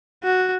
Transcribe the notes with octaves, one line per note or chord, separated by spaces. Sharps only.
F#4